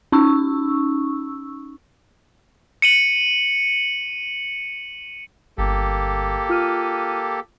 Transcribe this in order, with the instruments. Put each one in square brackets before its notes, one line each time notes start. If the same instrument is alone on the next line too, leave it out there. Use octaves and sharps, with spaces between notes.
[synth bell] C#4 D#4 C#6 E6
[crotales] C#7 D#7 F#7
[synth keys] G1 [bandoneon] A#3 G4 A4
[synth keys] F4 F6 D#7